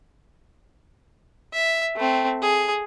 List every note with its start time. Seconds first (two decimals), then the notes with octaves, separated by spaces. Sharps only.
1.53 E5
1.97 A3 C4
2.42 G#4